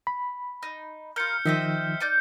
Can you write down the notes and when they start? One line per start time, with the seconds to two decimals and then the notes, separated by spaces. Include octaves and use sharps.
0.07 B5
0.63 D#4
1.16 F4 A#4 F6 G6 C#7
1.45 D#3 F3 C4 D#5 E5
2.00 D#4 D5 G6